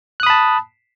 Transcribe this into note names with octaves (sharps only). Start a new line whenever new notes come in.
A5 B5 D#6 F#6